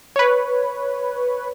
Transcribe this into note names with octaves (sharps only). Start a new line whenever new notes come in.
B4 C#5